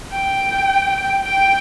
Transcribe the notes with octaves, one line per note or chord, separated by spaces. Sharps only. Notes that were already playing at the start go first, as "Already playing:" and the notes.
G5
G5